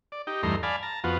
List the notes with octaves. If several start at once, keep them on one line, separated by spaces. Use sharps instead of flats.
D5
D#4 G4
E2 G2 A3 D#4 A#5 C6
D5 F5 G#5 A5 B5
A5 A#5
F2 B3 F4 F#4